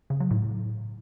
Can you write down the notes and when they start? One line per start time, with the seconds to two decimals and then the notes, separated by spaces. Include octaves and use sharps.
0.10 C#3
0.20 F#3
0.31 A2